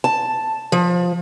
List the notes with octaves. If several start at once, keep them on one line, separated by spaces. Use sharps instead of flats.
A5
F3